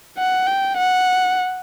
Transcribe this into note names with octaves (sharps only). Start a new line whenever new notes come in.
F#5
G5
F#5